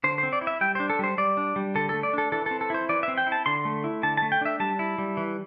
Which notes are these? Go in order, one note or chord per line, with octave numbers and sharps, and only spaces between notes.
D3 C5
C4 C5
D5
E4
E5
G3 G5
D4 C5
A4
G3 C5
G3 D5
D4
G3
D3 A4
A3 A4
D5
D4 A4
E3 A4
C4 A4
A4
E4 C5
E3 D5
C4 E5
G5
E4
A5
D3 C6
A3
E4
D3 A5
A3 A5
G5
D4 E5
G3 A5
E4
G3
E3